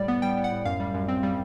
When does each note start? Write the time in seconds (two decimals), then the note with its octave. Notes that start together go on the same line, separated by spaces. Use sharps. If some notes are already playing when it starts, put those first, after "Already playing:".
Already playing: A2 G3 D5
0.08 B3
0.22 G3 G5
0.37 B3
0.44 F#5
0.52 A2
0.65 F#2 F5
0.80 G3
0.94 F#2
1.08 C4
1.23 G3